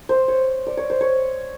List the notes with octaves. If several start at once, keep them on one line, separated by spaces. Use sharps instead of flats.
C5
C#5
D5
C#5
C5
C#5